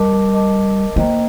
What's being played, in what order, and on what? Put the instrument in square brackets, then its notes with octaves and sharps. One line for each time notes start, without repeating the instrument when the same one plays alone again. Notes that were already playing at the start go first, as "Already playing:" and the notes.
Already playing: [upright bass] G3 [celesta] A#4 D#5 A5 D6
[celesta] A#4 D#5 A5 D6
[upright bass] A#3 [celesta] C5 D#5 G5 A#5